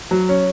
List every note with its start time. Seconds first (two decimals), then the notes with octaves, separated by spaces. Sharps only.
0.11 F#3
0.29 C#4